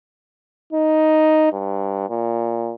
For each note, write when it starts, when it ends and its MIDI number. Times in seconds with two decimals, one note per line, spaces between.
0.73 1.52 63
1.52 2.09 43
2.09 2.75 46